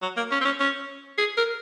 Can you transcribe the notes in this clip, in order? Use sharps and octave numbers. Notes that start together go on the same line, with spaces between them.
F#3
A#3
C#4
C4
C#4
C#4
G#4
A#4